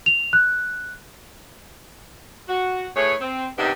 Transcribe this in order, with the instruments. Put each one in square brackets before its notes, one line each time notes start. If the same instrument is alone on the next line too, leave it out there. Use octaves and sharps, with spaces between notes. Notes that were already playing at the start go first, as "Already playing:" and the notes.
[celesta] F7
F#6
[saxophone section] F#4
A2 A3 G#4 B4 C#5
C4
C3 D#3 B3 D4 D#4 G4